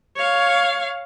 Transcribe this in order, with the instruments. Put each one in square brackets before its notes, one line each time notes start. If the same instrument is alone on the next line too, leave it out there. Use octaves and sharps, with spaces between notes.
[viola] C#5 F5